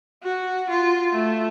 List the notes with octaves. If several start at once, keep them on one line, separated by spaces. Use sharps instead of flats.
F#4
F4
A3